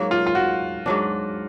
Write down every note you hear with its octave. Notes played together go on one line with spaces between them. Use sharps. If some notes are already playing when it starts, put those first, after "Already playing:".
Already playing: G#2 F#3 A#3
F4
F4
F#4
G#2 F#3 D4